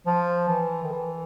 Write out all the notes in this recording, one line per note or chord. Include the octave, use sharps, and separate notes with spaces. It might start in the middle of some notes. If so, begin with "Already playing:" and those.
F3
E3
D#3
E3